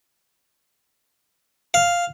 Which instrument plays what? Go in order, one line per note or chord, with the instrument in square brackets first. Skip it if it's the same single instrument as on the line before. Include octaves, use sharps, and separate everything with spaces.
[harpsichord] F5